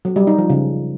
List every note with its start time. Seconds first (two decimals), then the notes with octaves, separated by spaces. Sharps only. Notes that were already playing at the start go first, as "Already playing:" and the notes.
0.05 F#3
0.16 G3
0.27 D#4
0.38 F3
0.50 C#3